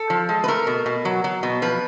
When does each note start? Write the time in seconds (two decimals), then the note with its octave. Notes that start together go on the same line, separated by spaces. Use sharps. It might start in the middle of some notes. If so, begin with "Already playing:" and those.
Already playing: A4
0.10 F3
0.29 G#3
0.44 B4
0.48 A3 A#4
0.67 B2
0.86 B2
1.05 F#3
1.24 F#3
1.43 B2
1.62 F3 B4